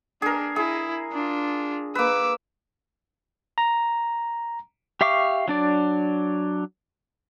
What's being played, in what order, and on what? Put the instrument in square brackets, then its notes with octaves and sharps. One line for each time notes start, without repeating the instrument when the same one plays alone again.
[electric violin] D4 [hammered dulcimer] G#4 A#4
[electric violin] E4 [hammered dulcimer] G#4
[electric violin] D4 F4
[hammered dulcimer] A#3 B4 [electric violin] D6 E6
[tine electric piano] A#5
[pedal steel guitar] G4 E5 F5 C#6 D6
F#3 D4 D5